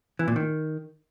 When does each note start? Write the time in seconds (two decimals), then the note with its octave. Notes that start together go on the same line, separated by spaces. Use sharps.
0.19 E3
0.28 A#2
0.36 D#3